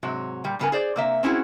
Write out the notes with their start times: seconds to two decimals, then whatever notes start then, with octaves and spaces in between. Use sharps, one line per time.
0.03 G#2 C3 F#3
0.44 A#2 G3
0.59 G2 C#3 B3 G#4 A#4 G#5
0.72 G#4 C5 D5
0.96 C3 A#3 E5
1.23 C4 C#4 E4 F#4 G#4